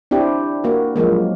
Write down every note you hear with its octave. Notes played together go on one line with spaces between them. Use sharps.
C4 D4 E4 G4
A#3 F#4
F3 F#3 G#3 A#3